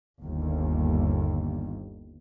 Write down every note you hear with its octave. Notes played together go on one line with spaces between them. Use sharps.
G1 D#2